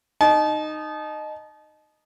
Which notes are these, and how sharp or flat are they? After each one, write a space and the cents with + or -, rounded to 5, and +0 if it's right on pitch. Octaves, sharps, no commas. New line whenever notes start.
D#4 -15 A5 -35